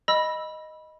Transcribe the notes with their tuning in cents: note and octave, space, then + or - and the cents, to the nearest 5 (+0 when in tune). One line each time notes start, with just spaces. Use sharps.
D#5 +0 B5 -15 E6 +0